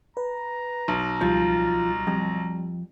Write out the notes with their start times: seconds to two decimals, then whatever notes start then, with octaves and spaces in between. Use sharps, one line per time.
0.17 B4 A#5
0.88 B1
1.21 C#2 F3 G3 A6
2.07 F2 G3